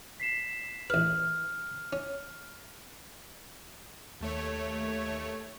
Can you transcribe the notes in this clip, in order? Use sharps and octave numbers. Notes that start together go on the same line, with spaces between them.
B6 C7 E7
A1 B4 F6
C#4
D#2 A3 C#5